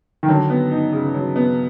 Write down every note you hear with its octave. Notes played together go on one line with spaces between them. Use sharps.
D#3
D3 F#3
B3
D#4
C#3
F#3
B3